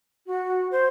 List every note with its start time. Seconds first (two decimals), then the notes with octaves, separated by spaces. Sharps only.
0.27 F#4
0.71 C5